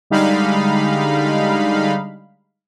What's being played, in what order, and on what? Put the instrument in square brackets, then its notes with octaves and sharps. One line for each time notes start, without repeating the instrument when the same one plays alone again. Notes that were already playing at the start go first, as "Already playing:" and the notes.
[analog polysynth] D3 G3 G#3 D#4 F5 B5